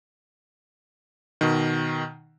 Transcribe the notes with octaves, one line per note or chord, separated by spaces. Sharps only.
B2 D#3